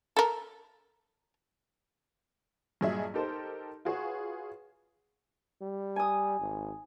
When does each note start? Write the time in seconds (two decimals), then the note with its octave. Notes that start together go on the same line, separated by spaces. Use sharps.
0.17 A4 A#4
2.81 G2 A#2 F#3 G#4 D#5 E5
3.14 D#4 G4 A4 A#4 C5
3.85 F4 F#4 G#4 B4 C#5
5.62 G3
5.96 G#5 D#6
6.40 G#1